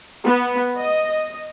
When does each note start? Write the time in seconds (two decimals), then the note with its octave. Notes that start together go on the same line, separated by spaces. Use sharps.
0.25 B3
0.79 D#5